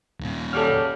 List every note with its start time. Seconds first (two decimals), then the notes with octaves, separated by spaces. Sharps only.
0.21 D#2 A#2
0.53 C#3 F#3 G3 A4 F6